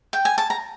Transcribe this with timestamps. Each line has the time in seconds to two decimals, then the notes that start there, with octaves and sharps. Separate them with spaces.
0.13 G5
0.25 G#5
0.38 A5
0.50 A#5